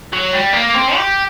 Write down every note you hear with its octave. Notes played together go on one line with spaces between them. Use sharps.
F#3
G3
A#3
C4
G4